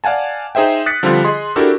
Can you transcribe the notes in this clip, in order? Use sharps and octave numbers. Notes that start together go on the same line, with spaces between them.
D5 F5 F#5 G#5 A5
D#4 G#4 C5 E5 G5
D#6 F#6 A6 B6 C#7
D3 F3 G3 C4 D4 F4
G#4 D#5 C6
D4 E4 F#4 G4 A4 A#4